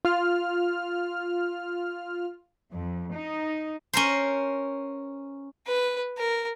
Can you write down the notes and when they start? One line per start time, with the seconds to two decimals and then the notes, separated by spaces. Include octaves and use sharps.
0.05 F4 F6
2.74 F2
3.14 D#4
3.93 C#4 A#4 C5
5.66 B4
6.18 A#4